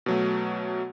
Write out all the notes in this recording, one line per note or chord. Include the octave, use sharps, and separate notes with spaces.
B2 F#3 A3